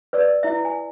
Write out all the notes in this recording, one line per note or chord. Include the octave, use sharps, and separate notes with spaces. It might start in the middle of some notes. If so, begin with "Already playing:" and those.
B4 D5 E6
E4 E5
G#5